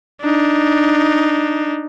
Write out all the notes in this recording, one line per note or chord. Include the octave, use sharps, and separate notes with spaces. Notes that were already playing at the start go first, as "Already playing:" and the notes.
D4 D#4